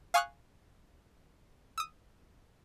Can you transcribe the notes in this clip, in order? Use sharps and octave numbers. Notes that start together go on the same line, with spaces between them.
F5 G#5 C#6 D#6 F6 F#6
D#6 E6